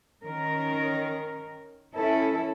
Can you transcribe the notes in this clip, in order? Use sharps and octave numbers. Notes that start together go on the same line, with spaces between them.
D#3 C#4 A#4
C#4 E4 A4